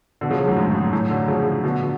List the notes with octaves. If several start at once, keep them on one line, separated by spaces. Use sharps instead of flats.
B2 D3
C#3 F3
D3 F#3
F#2 A2
F2 G#2
F#2
F#2 A2
D3 F#3
C#3 F3
B2 D3
B2